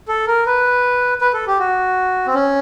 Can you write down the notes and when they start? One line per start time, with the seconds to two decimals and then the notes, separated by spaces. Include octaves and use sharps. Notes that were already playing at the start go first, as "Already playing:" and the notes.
0.08 A4
0.27 A#4
0.46 B4
1.21 B4
1.33 A4
1.47 G4
1.59 F#4
2.27 C4
2.34 C#4